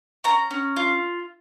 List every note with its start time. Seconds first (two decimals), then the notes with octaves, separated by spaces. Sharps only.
0.24 C#4 A#5
0.51 C#4
0.76 F4